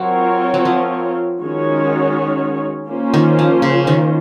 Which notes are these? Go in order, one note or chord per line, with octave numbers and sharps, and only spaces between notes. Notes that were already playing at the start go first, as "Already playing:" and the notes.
Already playing: F#3 C4 F4 A#4 C#5
F#3
F3
D#3 G#3 C#4 F#4 C#5
A#3 C#4 F4 C5
D#3
F3
C#3
D#3